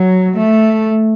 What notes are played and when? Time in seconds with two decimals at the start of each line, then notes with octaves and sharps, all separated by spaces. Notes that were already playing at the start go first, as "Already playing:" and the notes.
Already playing: F#3
0.35 A3